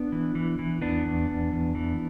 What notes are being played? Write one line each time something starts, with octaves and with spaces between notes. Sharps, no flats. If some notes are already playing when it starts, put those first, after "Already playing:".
Already playing: B3 D4
E3
E3
E3
E2 B3 D4
E2
E2
E2
E3